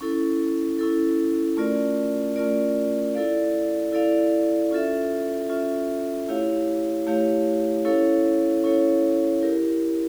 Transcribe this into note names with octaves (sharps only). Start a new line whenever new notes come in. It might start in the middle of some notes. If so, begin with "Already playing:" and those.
C#4 E4 A4
C#4 E4 A4
A3 C#4 F4 A#4 D5
A3 C#4 F4 A#4 D5
E4 A4 D5 F5
E4 A4 D5 F5
C#4 F4 A4 E5
C#4 F4 A4 E5
A3 E4 G4 C#5 F5
A3 E4 G4 C#5 F5
C#4 E4 A4 C#5 F5
C#4 E4 A4 C#5 F5
E4 G4 A#4